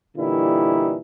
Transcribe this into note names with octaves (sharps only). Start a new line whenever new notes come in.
A#2 D3 E3 G3 D#4 E4